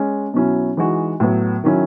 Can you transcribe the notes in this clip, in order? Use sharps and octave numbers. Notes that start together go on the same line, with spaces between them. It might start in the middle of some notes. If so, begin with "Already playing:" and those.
Already playing: G#3 C#4
B2 F#3 C#4 E4
E3 G#3 D#4 F#4
A2 F#3 B3
D#3 F#3 C#4 E4